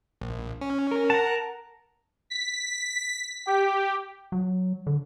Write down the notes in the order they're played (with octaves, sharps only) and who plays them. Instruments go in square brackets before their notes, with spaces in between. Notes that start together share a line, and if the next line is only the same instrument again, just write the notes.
[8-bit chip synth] A#1
C#4
[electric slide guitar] A#4
[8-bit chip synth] F#5 [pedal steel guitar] A5 A#5
[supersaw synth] B6
[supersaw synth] G4 [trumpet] G5
[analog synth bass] F#3
D3